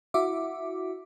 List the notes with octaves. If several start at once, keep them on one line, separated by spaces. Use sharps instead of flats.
E4 F#4 E5 D6